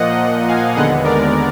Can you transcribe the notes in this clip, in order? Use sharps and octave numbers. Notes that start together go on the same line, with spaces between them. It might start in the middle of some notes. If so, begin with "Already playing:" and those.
Already playing: A#2 F3 A#3 D#5 F#5
D#5 F#5
F5 G#5
D#2 D3 G#3 B3 D#5 F#5
A#4 D5